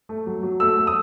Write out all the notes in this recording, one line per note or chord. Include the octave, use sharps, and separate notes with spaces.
A3
F#3
F#3
A3 E6
A3
D#6